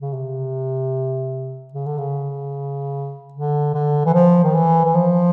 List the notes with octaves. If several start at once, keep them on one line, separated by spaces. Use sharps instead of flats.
C#3
C3
C#3
D3
C#3
D3
D3
E3
F3
D#3
E3
E3
F3